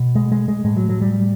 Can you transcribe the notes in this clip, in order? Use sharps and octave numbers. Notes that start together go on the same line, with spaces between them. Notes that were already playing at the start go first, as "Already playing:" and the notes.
Already playing: B2
G#3
G#3
G#3
A2 G#3
F#3
F#3
G3